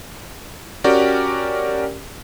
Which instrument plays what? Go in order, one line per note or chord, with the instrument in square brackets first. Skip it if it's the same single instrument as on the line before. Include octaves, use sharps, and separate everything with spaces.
[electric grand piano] C#4 F#4 G4 A#4 D5 G5